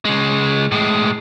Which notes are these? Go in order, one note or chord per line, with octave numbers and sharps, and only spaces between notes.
C#3 G#3
A2 G#3